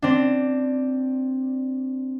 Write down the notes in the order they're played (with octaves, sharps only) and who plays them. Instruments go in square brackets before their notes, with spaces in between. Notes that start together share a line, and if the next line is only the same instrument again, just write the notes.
[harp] C4 D4